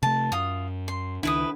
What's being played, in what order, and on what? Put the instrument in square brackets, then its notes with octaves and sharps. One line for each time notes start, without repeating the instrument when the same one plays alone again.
[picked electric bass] C3 A3 [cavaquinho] A5
[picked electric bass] F#2 [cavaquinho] F4 D#6
[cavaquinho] C6
[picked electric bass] C#2 D#3 D4 [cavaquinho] E4 B4 D#6